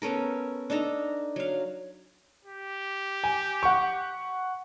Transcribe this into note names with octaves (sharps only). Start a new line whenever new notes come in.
B3 C#4 A4 A#4
D4 D#4 A4 A#5
F#3 F5
G4
G#5
F#5 C#6